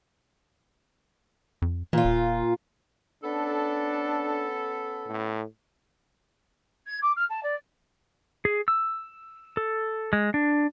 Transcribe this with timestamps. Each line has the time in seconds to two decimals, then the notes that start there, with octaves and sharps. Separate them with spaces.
1.62 F2
1.93 A#2 E3 F4
2.05 D#1
3.24 B3 C#4 D4 A4
5.07 A2
6.86 G#6
7.02 D6
7.16 F6
7.29 A5
7.43 D5
8.45 G#4
8.68 E6
9.57 A4
10.13 G#3
10.34 D4